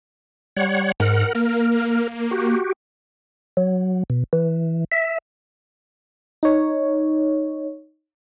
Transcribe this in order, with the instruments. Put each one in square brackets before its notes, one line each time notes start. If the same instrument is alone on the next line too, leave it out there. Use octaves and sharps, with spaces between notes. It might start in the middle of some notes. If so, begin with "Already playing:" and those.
[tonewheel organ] G3 C#5 F#5
[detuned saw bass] G#2 [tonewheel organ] A#4 F#5
[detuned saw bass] A#3 [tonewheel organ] A#4
[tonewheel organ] F#4 G4
F#3
B2
E3
E5
[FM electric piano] D#4 C#5